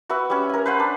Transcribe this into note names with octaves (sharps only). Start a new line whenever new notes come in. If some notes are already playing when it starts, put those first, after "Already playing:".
F#4 B4 E5
G3 C#4
A#4 G#5
B4 C5 F#5
D4